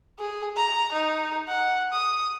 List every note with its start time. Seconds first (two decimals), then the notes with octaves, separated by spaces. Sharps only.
0.19 G#4
0.56 A#5
0.93 D#4
1.48 F#5
1.93 D#6